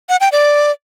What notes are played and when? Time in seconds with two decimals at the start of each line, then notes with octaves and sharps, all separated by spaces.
0.09 F#5
0.21 G5
0.32 D5